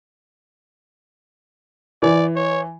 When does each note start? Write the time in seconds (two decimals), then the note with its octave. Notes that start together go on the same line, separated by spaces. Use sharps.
2.02 E3 D5
2.36 C#5